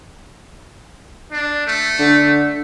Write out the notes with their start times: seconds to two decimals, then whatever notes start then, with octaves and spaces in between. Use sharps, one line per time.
1.32 D4
1.67 A3
1.99 D3